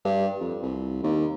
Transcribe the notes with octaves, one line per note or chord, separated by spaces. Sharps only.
G2
F2
C2
D#2